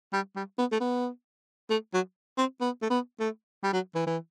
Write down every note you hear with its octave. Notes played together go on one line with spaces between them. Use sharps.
G3
G3
B3
A3
B3
A3
F#3
C4
B3
A3
B3
A3
G3
F#3
E3
E3